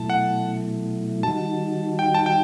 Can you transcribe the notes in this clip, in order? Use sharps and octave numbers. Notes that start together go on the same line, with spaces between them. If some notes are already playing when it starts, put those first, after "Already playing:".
Already playing: B2 F#3 A3 E4 A5
F#5
D#3 G3 D#4 F#4 A5
G5
A5
G5